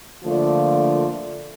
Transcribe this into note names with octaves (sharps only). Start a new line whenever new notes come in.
D3 F3 A3 A#3 F4 D5